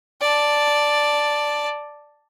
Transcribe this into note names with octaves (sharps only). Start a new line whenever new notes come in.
D5 A5